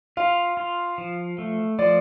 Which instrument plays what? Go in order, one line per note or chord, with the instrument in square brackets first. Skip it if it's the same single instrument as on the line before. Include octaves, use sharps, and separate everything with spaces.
[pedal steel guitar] F4 [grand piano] F5
[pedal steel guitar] F4
F3
A3
[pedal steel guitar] F3 [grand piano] D5